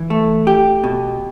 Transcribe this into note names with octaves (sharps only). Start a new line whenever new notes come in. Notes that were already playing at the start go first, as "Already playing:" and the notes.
Already playing: E3
A3
G4
B2